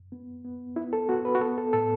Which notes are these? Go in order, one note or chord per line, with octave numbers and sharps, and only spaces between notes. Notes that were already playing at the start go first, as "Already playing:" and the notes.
Already playing: F#2
B3
B3
B3 E4
A4
B3 F#4
B4
F#4
B3 A4
A4
A2 A4